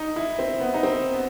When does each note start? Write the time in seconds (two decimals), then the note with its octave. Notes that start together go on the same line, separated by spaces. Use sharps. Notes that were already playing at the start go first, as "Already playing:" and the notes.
Already playing: D#4
0.16 E4
0.39 C4
0.60 B3
0.74 D#4
0.83 C4
1.14 B3